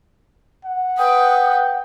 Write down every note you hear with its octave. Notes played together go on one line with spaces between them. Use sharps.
F#5
B4 G5 D#6